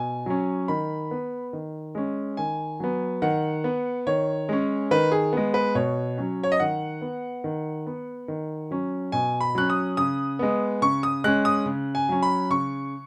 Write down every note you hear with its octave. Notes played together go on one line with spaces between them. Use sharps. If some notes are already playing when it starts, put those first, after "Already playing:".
Already playing: B2 G#5
F#3 C#4
D#3 B5
B3
D#3
G#3 C#4
D#3 G#5
F#3 B3
D#3 F#5
B3
D#3 C#5
G#3 C#4
D#3 B4
G#4
G#3 B3
B4
B2 C#5
F#3 C#4
C#5
D#5
D#3 F#5
B3
D#3
B3
D#3
F#3 C#4
B2 G#5
B5
F#3 C#4 F#6
D#6
C#3 D#6
G#3 B3
C#3 C#6
D#6
G#3 C#4 F#6
D#6
C#3
G#5
F#3 C#4
B5
C#3 C#6